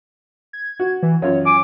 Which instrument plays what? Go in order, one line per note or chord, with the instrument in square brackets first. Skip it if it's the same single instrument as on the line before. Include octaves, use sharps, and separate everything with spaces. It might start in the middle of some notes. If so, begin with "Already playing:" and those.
[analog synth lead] G#6
[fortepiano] F#4
[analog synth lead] E3
[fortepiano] F#2 F4 [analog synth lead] C#5
[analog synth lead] G#5 [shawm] D6